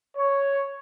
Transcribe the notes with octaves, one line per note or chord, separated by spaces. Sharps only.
C#5